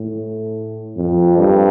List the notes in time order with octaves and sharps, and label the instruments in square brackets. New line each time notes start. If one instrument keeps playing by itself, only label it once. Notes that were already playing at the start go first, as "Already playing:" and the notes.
Already playing: [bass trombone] A2
F2
G2